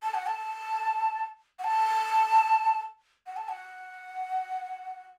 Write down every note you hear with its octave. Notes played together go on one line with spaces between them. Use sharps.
A5
F#5
A5
F#5
A5
F#5
A5
F#5